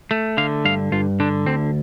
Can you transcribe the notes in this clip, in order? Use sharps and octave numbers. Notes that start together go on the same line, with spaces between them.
A3
D3 F5
G2 F5
G2 F4
D3 D4
D2 C4